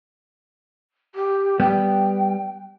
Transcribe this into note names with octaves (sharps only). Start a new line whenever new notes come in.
G4
G3 B3 G5